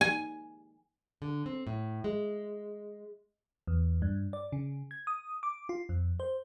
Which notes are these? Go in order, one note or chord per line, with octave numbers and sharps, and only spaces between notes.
G#5
D3
C4
A2
G#3
E2
G2
D5
C#3
G#6
D#6
D6
F4
F2
C5